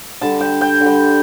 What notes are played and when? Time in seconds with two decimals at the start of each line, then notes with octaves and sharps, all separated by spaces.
0.21 D3 G3 A5
0.41 G5
0.61 G5
0.81 D3
0.86 G3